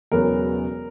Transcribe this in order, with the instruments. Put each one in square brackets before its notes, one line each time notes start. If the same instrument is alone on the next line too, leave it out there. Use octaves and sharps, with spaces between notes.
[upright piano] E1 E2 C#3 F#3 B3 A#4